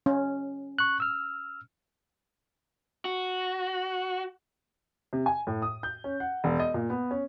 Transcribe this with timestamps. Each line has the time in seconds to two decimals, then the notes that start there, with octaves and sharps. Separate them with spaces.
0.06 C#4
0.79 C#6 F#6
1.00 E6 F6
3.05 F#4
5.13 C3
5.26 G#5
5.47 A2
5.62 D#6
5.83 G6
6.04 C#4
6.20 F#5
6.44 E1
6.60 D#5
6.74 A#2
6.90 B3
7.11 C#4